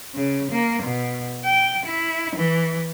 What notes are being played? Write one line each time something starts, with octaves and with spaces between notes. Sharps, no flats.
C#3
A#3
B2
G5
E4
E3